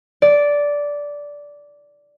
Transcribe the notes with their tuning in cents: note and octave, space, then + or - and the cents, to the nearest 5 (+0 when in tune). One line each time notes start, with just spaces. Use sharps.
D5 -10